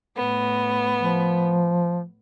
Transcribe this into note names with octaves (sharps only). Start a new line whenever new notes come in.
A2 B3
F3